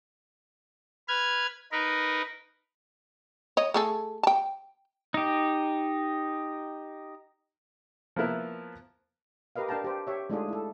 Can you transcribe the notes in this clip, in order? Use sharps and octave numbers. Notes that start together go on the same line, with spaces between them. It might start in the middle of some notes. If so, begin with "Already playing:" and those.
B4 F6 G#6
D#4 A#4 B4
C#5 D#5
A3 G#4 A4
G5 A5
D#4 G4
F3 A#3 B3 E4 A#4
G4 A#4 B4 D#5 F5
D4 A#4 F5 G5 A5 A#5
G4 C5
G4 C#5 E5
G#3 A3 D4 D#4 F4 G#4
E4 A4